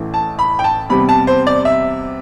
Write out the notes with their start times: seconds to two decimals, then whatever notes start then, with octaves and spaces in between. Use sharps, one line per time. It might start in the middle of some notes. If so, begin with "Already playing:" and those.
Already playing: A1 A2 E3
0.14 A5
0.39 B5
0.59 G5
0.64 A5
0.89 E2 C3 G3 B5
1.09 A5
1.27 C5
1.47 D5
1.65 E5